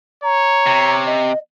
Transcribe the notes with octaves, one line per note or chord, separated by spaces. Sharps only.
C#5 A#5
C3
D#5